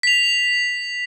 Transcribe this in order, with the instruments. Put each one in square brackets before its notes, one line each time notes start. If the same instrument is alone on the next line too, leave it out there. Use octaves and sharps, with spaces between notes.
[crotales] B6 F7